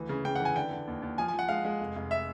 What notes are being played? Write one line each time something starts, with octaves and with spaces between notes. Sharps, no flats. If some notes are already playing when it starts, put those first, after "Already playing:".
Already playing: D2 E3
C#3
C#3 G5
E3 F#5
G#5
D3 G5
D3
D#2
D#2
F3 G#5
G#5
F3
F#5
G#3 F5
G#3
F1
F1
E5